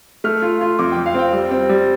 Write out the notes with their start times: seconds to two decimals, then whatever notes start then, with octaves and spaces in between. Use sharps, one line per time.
0.24 A3 F6
0.42 F4
0.61 F4
0.79 F2 D6
0.92 F2 G5
1.06 F5
1.15 C4 G5
1.33 G3
1.51 C4
1.69 G3